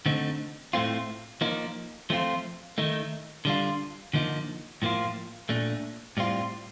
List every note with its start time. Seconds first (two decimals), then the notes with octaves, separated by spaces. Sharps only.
0.06 D3 A3 C4 D#4
0.73 A2 A3 C4 F4
1.41 F3 A#3 D#4
2.10 F3 A3 C4 F4
2.78 D#3 A3 D#4
3.45 D3 G3 D4 F4
4.13 D3 F3 A#3 D#4
4.82 A2 F3 A#3 F4
5.49 A#2 A3 D4
6.17 A2 G3 C4 F4